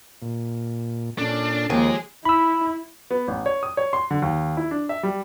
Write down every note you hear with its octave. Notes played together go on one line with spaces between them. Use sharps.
A#2
A#2 C#4 D4 A4
D#2 F3 G#3 G#4 D6
E4 B5 E6
B3
A1
C#5
D#6
C#5
C6
D3
D#2
E4
D4
E5
G3